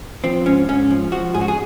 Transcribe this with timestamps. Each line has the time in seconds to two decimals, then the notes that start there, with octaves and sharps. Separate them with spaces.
0.24 F3 C4
0.46 G#2 C#4
0.68 G#2 C#4
0.90 F3
1.12 F3 F#4
1.34 G#2 G#4
1.41 F#4
1.48 G#4